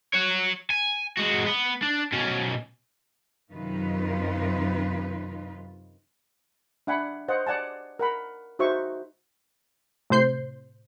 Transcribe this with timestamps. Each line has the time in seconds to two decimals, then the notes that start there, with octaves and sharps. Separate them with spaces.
0.14 C#5 F#5
0.70 G#5
1.17 G#3 F#4
1.46 B3
1.82 D4
2.12 B2 C#4
3.52 F#2 C3 D#3 D#4 F4 B4
6.87 D4 E5 F#5 G#5 B5
7.28 C5 D#5 F5 F#5
7.47 D5 F#5 G#5 A5
7.99 A#4 F#5 B5
8.59 D#4 F#4 C5 E5 C#6
10.10 A2 C3 C5 G6 C7